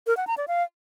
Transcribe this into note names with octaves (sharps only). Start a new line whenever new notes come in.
A#4
F#5
A#5
D5
F5